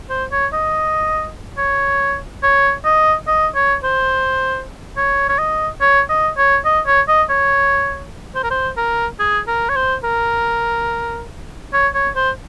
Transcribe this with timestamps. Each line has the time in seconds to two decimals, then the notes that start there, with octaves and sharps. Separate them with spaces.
0.10 C5
0.32 C#5
0.53 D#5
1.58 C#5
2.43 C#5
2.85 D#5
3.27 D#5
3.55 C#5
3.84 C5
4.97 C#5
5.29 C#5
5.39 D#5
5.81 C#5
6.09 D#5
6.38 C#5
6.65 D#5
6.87 C#5
7.08 D#5
7.30 C#5
8.35 C5
8.44 A#4
8.51 C5
8.77 A#4
9.19 G#4
9.47 A#4
9.69 C#5
9.76 C5
10.04 A#4
11.73 C#5
11.95 C#5
12.16 C5